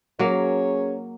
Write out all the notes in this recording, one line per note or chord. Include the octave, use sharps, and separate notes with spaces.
F#3 A#3 C#4 G#4 C#5